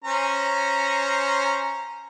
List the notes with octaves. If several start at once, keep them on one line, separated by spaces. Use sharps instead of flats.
C#4 C5 A#5